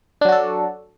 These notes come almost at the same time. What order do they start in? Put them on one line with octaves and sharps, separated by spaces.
D4 F#3 F#4 A4